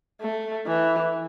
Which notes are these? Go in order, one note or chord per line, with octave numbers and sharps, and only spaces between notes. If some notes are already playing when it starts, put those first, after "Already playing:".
A3
E3